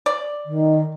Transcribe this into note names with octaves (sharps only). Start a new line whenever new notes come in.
D5
D#3